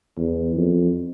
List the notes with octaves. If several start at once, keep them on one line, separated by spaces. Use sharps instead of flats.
E2
F2